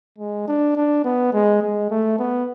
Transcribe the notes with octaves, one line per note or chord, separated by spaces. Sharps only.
G#3
D4
D4
B3
G#3
G#3
A3
B3